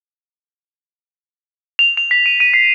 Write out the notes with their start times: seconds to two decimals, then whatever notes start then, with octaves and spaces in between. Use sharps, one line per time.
1.79 F7
1.97 F7
2.11 B6
2.26 D#7
2.40 D#7
2.54 C7